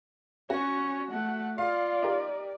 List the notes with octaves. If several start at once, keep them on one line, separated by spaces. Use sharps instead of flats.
C#4 F#4 C#5
A3 F#5
F4 D5 F5
D#4 G4 A#4